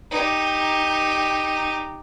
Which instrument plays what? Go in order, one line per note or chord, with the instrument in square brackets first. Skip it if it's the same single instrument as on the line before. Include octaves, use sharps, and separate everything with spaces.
[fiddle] D#4 G4